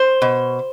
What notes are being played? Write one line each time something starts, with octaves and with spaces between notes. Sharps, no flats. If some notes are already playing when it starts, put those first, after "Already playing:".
Already playing: C5
B2